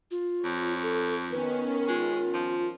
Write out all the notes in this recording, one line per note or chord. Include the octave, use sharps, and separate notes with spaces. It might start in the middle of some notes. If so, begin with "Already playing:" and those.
F4
F2 C#5
A4
D#3 B3 C#4 B4
G#3 F4
F3